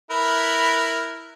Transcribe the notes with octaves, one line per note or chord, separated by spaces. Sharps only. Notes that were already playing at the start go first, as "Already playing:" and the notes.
E4 A#4 B4